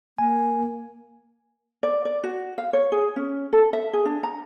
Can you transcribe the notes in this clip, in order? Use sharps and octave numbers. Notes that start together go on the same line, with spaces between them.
A#3 G#5
D5
D5
F#4
F5
C#5
G#4
C#4
A4
E5
G#4
D4
A#5